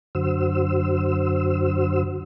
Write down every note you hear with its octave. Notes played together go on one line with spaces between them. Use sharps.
F#2 D3 F#4 C5 E6